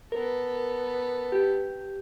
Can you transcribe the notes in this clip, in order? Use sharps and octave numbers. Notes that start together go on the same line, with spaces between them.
B3 A4 A#4
G4